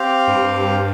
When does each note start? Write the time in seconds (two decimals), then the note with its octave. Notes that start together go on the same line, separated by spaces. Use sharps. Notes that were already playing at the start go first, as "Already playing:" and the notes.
Already playing: C4 G4 F5
0.28 G2